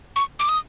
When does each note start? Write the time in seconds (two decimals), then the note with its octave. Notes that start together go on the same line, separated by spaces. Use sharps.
0.16 C#6
0.39 D6
0.49 D#6